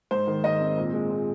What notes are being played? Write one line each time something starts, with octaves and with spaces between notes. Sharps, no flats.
G#2 C5
D#3
G#2 D#5
C4
A#2
G#3
A#2